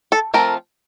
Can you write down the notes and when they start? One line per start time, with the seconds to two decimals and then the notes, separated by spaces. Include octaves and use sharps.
0.12 A4
0.34 F3 A3 C4 F4 A#4